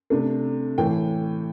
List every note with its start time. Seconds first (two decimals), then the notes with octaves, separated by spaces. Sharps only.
0.10 C3 A3 D4
0.78 A2 E3 A3 G5